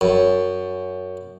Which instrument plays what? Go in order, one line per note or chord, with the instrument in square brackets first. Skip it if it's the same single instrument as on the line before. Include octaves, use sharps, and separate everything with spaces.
[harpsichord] F#2